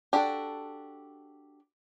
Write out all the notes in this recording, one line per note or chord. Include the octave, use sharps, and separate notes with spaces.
D4 F#4 G4 A4